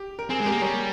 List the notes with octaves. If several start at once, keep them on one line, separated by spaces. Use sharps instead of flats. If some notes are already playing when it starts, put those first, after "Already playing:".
Already playing: G4
A#4
C4 G#4
G#3
A#3 G4 A#4
G3 A#4 C#5